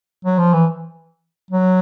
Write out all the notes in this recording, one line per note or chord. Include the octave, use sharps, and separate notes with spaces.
F#3
F3
E3
F#3